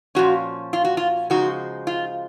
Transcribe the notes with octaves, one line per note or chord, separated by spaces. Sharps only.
A#2 F3 G#3 C#4 F#4
F4
F#4
F4
C#3 F3 G#3 D#4 F#4
F4